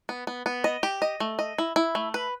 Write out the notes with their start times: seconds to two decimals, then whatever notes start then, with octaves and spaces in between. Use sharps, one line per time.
0.09 B3
0.27 B3
0.46 B3
0.64 D#5
0.83 G4
1.02 D#5
1.20 A3
1.39 D#5
1.58 E4
1.76 E4
1.95 A3
2.14 B4